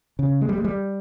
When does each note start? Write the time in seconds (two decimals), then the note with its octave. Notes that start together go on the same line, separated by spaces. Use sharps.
0.19 C#3
0.41 G#3
0.49 G3
0.58 G#3
0.65 G3